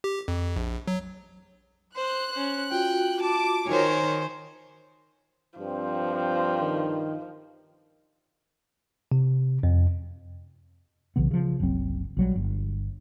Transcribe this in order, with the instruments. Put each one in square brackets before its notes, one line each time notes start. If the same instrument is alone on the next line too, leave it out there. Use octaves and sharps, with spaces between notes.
[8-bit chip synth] G4
F2
A#1
F#3
[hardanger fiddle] C5 [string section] F#6
[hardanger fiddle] C#4 C5
[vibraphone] F4 F#4 [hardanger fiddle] G5
[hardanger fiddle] A5 [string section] D6
[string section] D#3 A#4 C#5 [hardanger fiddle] C5 G#5
[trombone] G2 [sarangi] F3 [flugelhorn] C4
[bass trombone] D#3
[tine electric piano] C3
F2
[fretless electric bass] B1 C#3 E3 B3
C#3 F3
F#1 C2 F#3 C4
A#1 F#3 G3
G1